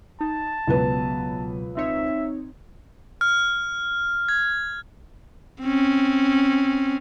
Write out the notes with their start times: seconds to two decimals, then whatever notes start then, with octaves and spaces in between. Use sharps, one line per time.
0.21 D#4 A5
0.67 C#2 B2 F#3 B3 B4
1.77 C4 D#4 C#5 E5
3.21 F6
4.29 G#6
5.62 C4 C#4